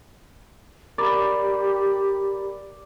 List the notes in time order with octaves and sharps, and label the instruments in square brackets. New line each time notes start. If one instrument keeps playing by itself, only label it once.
[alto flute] G4 [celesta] A#4 A#5 B5 [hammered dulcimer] D5